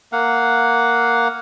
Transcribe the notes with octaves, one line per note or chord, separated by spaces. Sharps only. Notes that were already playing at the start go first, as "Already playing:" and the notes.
A#3 F5 F#5